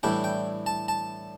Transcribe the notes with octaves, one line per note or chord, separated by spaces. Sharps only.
A2 E3 G3 D4 G5
G5
A5
A5